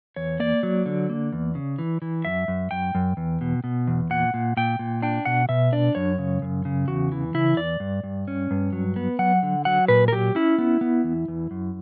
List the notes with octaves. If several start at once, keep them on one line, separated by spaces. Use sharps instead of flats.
E2 C#5
A#3 D5
F#3
D3
A#3
E2
C#3
E3
E3
F#2 E5
F#2
F#2 G5
F#2
E2
B2
B2
E2
A#2 F#5
A#2
A#2 G5
A#2
D4 G5
B2 F#5
B2 E5
D4 D5
F#2 C#5
C#3
F#2
C#3
E2 F#4
E3
C#3 E4
E2 D5
G2
G2
C#4
G2
F#3
B3
F#3 F#5
D3
F#3 F#5
A#2 B4
A#4
F#3 G4
C#4 E4
B3
B3
E2
E2
F#2